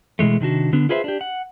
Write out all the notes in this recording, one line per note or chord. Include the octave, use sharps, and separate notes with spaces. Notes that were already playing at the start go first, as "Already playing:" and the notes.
B2 E3 G#3 A3
C3 D#3 D4 F#4
D3 B3 D4
F4 G#4 B4 C5 E5
D4 G4
F#5